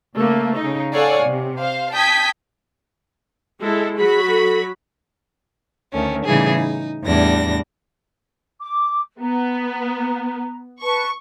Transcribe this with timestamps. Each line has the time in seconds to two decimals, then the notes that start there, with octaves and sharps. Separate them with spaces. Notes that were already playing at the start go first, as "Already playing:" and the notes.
0.17 C#3 A3 A#3
0.57 C#3 D#4
0.93 A4 C#5 D5 F5 F#5 G#5
1.26 C3
1.59 C5 F5
1.93 G5 A5 D#6 G6 G#6 B6
3.60 G#3 E4 A4
3.97 F#3 F#4 G#4 B5
4.29 A4
5.93 D2 D#3 A3 C#4
6.25 A2 C#3 E3 G3 D#4 G#4
6.56 D#4
7.05 E2 A2 G3 D4 A#6
8.60 D6
9.20 B3 A#5
10.82 B4 A5 C#6